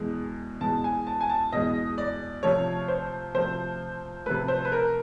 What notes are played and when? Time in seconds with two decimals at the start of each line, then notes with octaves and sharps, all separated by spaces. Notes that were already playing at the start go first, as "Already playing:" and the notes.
Already playing: E2 B2 G#3
0.60 E2 B2 G#3 A5
0.84 G#5
1.07 A5
1.21 G#5
1.30 A5
1.52 E2 B2 G#3 D#5
1.98 D5
2.43 C3 F3 A3 C#5
2.88 C5
3.34 C3 F3 A3 C5
4.26 C3 F3 A3 B4
4.48 C5
4.65 B4
4.72 A#4